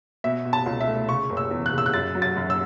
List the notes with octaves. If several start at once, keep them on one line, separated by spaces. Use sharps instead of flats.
B2 E5
B2
A5
C#2
E5
A3
C#3 C#6
F#1
E6
E2
F#6
C#3
E6
F#6
F#2 A6
F#3
A6
F#2
E6